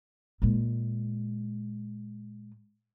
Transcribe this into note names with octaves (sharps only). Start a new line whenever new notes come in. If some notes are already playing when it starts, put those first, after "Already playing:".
A#2 G#3